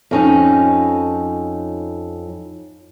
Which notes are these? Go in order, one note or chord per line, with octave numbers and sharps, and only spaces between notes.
F2 C#4 D#4